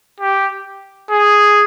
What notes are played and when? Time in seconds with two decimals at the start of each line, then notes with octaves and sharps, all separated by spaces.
0.20 G4
1.11 G#4